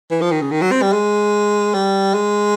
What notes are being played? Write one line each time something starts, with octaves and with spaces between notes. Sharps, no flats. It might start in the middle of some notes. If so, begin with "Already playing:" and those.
E3
F3
D#3
C#3
D#3
F#3
C4
G3
G#3
G3
G#3